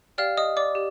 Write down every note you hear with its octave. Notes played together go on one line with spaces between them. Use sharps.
G4 D5 F5 G5 F6
D#5 D#6
D5 D6
G4